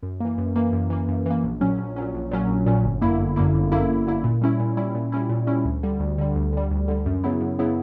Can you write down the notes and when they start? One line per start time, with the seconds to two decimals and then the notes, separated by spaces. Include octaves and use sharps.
0.03 F#2
0.20 E3 A#3
0.38 F#2
0.56 E3 A#3
0.73 F#2
0.90 E3 A#3
1.08 F#2
1.26 E3 A#3
1.44 A#1
1.61 A#2 F#3 C#4
1.79 A#1
1.96 A#2 F#3 C#4
2.14 A#1
2.31 A#2 F#3 C#4
2.49 A#1
2.66 A#2 F#3 C#4
2.85 G1
3.02 F#2 D3 A#3 E4
3.19 G1
3.36 F#2 D3 A#3 E4
3.55 G1
3.72 F#2 D3 A#3 E4
3.90 G1
4.07 F#2 D3 A#3 E4
4.24 A#2
4.42 G3 C#4 E4
4.60 A#2
4.77 G3 C#4 E4
4.95 A#2
5.12 G3 C#4 E4
5.29 A#2
5.47 G3 C#4 E4
5.65 D2
5.83 D3 G3
6.00 D2
6.18 D3 G3
6.35 D2
6.53 D3 G3
6.71 D2
6.88 D3 G3
7.06 F#2
7.24 C#3 F#3 B3 E4
7.41 F#2
7.59 C#3 F#3 B3 E4